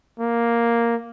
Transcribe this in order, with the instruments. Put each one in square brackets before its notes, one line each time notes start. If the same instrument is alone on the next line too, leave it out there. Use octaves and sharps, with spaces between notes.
[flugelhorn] A#3